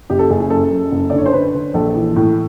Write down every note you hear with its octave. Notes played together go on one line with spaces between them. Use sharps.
F#1 G4
A4
F#1 G#4
G#4
F#2 A4
F#2
F#1
D5
D3
C#5
C5
D3 B4
D3
A#1 A4
E3
A2